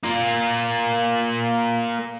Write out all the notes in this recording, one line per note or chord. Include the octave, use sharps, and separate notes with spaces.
A#3 F4